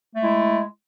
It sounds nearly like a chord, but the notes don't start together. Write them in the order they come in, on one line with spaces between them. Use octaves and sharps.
A3 G#3 E4